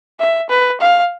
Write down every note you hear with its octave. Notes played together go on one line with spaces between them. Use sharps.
E5
B4
F5